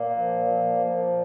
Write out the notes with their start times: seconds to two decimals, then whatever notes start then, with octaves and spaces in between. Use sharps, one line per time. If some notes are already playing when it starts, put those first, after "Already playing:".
Already playing: A#2 A#3
0.15 F3
0.45 F3
0.76 F3
1.07 A#2